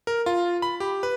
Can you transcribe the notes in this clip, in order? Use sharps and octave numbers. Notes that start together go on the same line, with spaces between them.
A#4
F4
B5
G4
B4